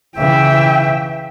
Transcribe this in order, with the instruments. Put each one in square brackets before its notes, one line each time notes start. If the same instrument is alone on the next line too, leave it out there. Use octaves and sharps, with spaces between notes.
[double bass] C#3 E3 [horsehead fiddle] E5 G5